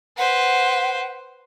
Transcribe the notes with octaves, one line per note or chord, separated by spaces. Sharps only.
B4 C5 F#5